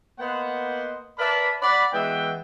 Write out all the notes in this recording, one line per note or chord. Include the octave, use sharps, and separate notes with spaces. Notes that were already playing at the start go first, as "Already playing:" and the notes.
A#3 B3 C5 D#5 F#5
A#4 B4 D5 E5 A5 B5
D5 F#5 B5
E3 G#3 B3 F#4 E5 G5